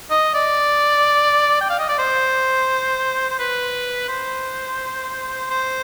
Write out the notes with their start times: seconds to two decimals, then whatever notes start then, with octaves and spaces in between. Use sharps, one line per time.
0.10 D#5
0.34 D5
1.61 G5
1.70 F5
1.79 D#5
1.89 D5
1.98 C5
3.30 C5
3.39 B4
4.08 C5
5.50 C5